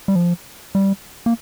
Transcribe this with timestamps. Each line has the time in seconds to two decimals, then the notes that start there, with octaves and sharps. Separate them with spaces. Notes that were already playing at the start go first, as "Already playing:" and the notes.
0.08 G3
0.16 F3
0.75 G3
1.26 A#3